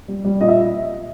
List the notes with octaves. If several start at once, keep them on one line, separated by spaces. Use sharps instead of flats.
G3
G3
A#2 D#5
E5